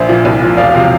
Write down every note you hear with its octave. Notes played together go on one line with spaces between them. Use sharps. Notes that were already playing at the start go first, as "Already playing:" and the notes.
Already playing: A#1 C5 E5
A#2 F3
C2
A#2 F3
E1 D5 F5
C3 F3